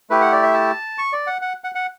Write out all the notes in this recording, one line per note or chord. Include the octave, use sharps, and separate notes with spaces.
A3 E4 G4 B4
F#5
D5
E5
A5
C#6
D5
F#5
F#5
F#5
F#5